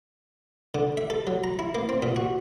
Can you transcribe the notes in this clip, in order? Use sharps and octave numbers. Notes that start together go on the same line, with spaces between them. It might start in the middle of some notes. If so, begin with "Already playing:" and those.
D3
E5
A4
F#3
A#5
E4
A#3
C4
A#2
F#4